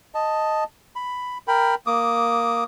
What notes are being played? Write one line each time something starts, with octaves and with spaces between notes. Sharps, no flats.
D#5 A5
B5
A#4 G5 B5
A#3 D6 D#6